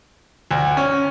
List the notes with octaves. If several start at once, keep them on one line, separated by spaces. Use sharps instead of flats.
D2
C#4